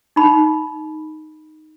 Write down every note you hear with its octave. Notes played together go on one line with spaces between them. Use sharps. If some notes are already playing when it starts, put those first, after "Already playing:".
D#4 B5